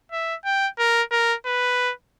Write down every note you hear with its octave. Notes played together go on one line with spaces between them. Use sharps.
E5
G5
A#4
A#4
B4